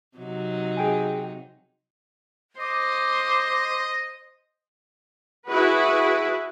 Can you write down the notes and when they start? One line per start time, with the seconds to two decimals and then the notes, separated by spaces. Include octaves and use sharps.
0.17 C3 F#3 D#4
0.77 G#4 G5 G#5
2.60 C5 D#5 D6
5.48 E4 F#4 G#4 B4